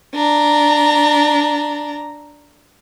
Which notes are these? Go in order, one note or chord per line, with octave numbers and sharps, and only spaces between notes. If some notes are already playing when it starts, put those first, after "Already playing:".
D4 A#5